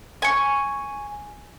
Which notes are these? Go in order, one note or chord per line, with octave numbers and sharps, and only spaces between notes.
G#5 C#6